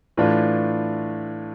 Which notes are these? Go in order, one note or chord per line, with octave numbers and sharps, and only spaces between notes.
A2 E3 A3 D4 F4